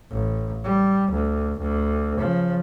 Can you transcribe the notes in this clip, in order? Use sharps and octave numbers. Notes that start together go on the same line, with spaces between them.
A1
G3
D2
D2
C#3 F3